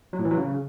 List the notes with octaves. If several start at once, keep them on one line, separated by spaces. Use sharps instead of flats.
F#3
A2
E3
F#3
C#3